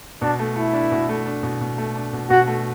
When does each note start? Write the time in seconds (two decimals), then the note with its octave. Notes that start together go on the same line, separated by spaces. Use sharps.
0.22 B2 D4
0.39 A3
0.56 A3 E4
0.73 D4
0.92 B2
1.09 A3
1.26 D4
1.43 B2
1.61 B2
1.78 A3
1.96 D4
2.13 B2
2.30 B2 F#4
2.47 A3